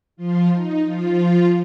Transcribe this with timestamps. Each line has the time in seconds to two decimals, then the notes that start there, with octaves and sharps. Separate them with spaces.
0.17 F3 F4
0.51 D#4
0.84 F3 F4